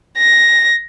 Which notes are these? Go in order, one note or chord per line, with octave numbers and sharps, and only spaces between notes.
A#6